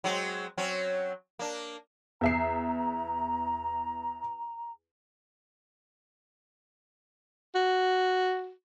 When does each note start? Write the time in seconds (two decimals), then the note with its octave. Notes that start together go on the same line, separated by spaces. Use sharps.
0.04 F#3 G#3 C4
0.57 F#3 C4 C#4
1.39 A#3 D4
2.21 E2 E5 A#5 C7
7.55 F#4